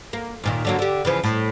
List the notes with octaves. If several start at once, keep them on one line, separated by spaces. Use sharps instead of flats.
A#3
D#2 A#2 D#3
D3 F#3 A#3
D3 G4
C#3 E3 F3
A2